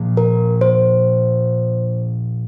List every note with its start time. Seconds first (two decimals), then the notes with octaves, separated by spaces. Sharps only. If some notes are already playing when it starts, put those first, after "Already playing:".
Already playing: A#2 F3 A#3
0.17 A#4
0.61 C5